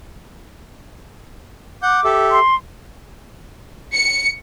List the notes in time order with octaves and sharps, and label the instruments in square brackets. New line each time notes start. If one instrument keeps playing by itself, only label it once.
[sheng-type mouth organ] F#5 G6 [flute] D6
[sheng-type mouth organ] G4 A4 E5
[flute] C6
[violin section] C#7